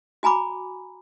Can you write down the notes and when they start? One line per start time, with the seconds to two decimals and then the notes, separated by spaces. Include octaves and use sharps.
0.23 F#4 G#5 A#5 B5 D6